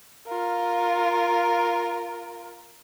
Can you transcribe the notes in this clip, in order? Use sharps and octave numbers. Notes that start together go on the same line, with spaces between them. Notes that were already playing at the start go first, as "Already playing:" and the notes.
F4 A#4